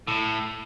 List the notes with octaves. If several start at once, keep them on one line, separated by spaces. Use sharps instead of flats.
A2